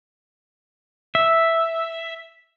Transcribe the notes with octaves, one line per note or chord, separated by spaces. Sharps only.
E5